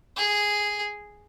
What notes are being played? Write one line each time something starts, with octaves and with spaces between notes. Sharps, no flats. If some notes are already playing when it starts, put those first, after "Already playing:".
G#4